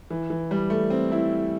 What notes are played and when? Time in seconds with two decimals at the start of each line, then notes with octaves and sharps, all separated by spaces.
0.10 E3
0.30 E3
0.51 G3
0.70 A3
0.90 C4
1.12 E4